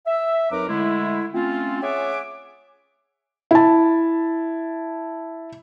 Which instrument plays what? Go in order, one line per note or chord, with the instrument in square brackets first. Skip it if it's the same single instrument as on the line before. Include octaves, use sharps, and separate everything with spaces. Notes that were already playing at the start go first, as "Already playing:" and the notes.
[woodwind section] E5
F2 F#3 D#4 A#4 B4 D6
D3 G#3 A3 E4
A3 C4 C#4 F4
G#4 C#5 E5 F#5 G#5 D6
[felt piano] E4 A5